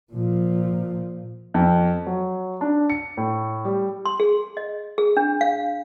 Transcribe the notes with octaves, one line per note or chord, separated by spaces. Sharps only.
A#2 F3
F2
F#3
D4
C#7
A2
G3
C6
G#4
D#5
G#4
D4
F5